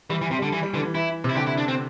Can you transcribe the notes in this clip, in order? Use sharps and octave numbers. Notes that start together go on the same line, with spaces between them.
E3 G3
E3
C3
D3 G3
E3
G3
D3 E3
E3
E3 E4
C3
E4
D3 G4
E4
D4
C4